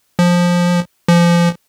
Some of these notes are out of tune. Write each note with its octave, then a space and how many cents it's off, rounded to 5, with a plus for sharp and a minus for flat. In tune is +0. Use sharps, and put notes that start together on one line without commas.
F3 +10
F3 -25